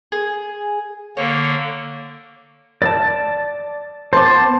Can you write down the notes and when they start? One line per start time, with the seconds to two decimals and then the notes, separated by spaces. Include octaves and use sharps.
0.12 G#4
1.17 D3 A#3 C#5
2.82 D5 A5 A6
4.13 B3 C5 A5 C6 D6